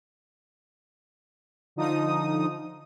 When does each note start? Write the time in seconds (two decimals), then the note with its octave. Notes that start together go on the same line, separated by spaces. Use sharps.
1.76 D3 F3 D#4 D#6